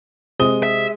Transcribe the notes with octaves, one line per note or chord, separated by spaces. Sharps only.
C3 G#3 D#6 G7
E5